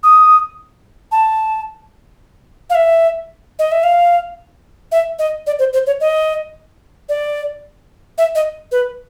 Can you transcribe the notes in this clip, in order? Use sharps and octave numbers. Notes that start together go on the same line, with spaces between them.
D#6
A5
F5
E5
D#5
E5
F5
E5
D#5
D5
C5
C5
C#5
D#5
D5
E5
D#5
B4